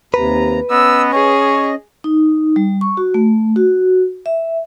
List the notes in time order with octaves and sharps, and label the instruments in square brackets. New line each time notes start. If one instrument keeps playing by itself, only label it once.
[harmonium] D#2 C3 A#5 [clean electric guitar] B4
[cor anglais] B3 [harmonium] C#4 D#5 [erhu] E6
[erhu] G#4 [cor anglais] C#5
[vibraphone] D#4
G3
C#6
F#4
A3
F#4
E5